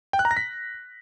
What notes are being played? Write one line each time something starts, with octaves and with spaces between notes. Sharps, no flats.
G5
F#6
A#5
A#6
B6